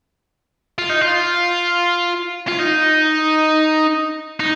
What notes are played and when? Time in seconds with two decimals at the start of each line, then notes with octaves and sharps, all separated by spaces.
0.79 F4
0.90 D#4
1.01 F4
2.48 F4
2.59 D#4
4.40 D#4